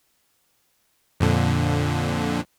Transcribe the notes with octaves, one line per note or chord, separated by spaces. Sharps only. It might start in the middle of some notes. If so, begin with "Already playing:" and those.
F2 A#2 D3